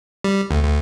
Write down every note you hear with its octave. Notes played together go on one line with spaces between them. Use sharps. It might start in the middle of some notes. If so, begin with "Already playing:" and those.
G3
D2
D2